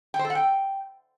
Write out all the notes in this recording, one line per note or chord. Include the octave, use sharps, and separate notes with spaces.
G5
C5
A4
F#5
G5